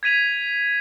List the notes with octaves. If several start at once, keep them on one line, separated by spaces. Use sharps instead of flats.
G#6 B6 D#7 F7